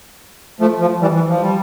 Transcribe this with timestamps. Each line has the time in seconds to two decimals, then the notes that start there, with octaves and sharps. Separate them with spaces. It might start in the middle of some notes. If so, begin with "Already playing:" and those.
0.60 F3 A3
0.80 F3
1.01 E3 G3
1.15 E3
1.29 F3
1.42 G3